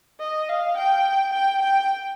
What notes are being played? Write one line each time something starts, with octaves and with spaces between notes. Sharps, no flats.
D#5
F5
G5
G5
G5